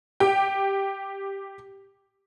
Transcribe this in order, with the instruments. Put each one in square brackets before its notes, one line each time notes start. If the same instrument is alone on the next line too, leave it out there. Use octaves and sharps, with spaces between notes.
[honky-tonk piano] G4 G5